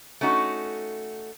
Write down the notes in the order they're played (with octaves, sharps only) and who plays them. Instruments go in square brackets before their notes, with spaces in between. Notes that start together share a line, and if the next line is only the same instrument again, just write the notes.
[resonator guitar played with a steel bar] A3 C#4 D#4 F#4